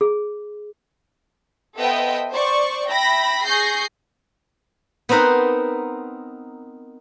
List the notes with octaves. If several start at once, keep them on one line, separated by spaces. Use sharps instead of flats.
G#4
B3 A4 C5 D#5 E5 G5
C5 D5 C#6
E5 G5 B5 A#6
G#4 C#6 G6 A#6 C7
B3 C4 D#4 A#4 B4 F#5